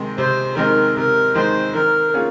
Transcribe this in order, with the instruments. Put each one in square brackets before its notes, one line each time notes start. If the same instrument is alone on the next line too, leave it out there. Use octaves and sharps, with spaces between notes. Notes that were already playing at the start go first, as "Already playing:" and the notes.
Already playing: [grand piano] C3 D#3 G#3 C4 D#4
[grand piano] C3 [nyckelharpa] C5
[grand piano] D#3 G#3 C4 D#4 [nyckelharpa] A#4
[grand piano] C3 [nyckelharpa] A#4
[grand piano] D#3 G#3 C4 D#4 [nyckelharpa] C5
[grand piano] D#3 [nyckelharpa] A#4
[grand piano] A#3 C#4 F4 G#4